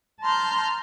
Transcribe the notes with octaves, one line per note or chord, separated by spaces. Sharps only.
A5 A#5 C6 F6 G6